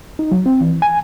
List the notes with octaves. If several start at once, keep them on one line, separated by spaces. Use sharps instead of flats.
D#4
F#3
C4
E3
G#5